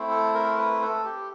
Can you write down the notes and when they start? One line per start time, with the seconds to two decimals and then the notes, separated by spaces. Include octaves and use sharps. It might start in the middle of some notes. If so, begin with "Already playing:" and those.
Already playing: A3 C4 E4
0.10 A4
0.34 A#4
0.57 B4
0.81 A4
1.04 G4